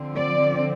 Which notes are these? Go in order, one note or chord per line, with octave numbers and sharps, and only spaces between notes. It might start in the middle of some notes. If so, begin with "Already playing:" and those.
Already playing: D3 F3 C4
D5